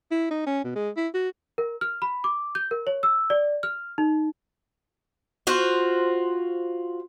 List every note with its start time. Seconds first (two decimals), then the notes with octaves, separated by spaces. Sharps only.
0.11 E4
0.31 D#4
0.46 C#4
0.64 B2
0.75 G#3
0.97 E4
1.14 F#4
1.58 A#4
1.81 F6
2.02 B5
2.24 D6
2.55 G6
2.71 A#4
2.87 C#5
3.03 E6
3.30 D5
3.63 F6
3.98 D#4
5.47 F4 F#4 C5